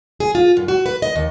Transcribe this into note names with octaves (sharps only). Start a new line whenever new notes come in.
G#4
F4
F#2
F#4
B4
D#5
D#2